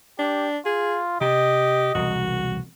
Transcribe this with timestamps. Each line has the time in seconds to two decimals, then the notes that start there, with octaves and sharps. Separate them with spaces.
0.19 D4 G4
0.66 F4 G#4
1.21 C3 G4 D#5
1.95 E1 C2 F#4